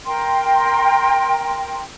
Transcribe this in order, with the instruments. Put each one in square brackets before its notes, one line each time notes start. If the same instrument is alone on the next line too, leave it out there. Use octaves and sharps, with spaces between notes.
[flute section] A#4 G5 C6